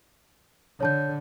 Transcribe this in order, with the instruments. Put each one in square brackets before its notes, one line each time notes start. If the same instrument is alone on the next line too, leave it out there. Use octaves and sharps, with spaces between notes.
[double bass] D3 [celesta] C#5 A5 G6